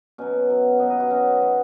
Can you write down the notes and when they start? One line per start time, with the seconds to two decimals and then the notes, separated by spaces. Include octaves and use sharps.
0.18 B2 F#3 C#4
0.49 B2 F#3
0.79 B2 F#3 B3 D#4
0.90 B4 D#5
1.00 F#4 B4
1.10 B2 F#3 C#4 F#4
1.41 F#3